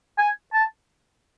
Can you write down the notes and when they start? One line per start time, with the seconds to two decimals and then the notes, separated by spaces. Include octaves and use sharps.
0.18 G#5
0.53 A5